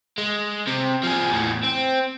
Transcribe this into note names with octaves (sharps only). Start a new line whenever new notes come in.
G#3
C3
F3 G#4
E2 A2
C4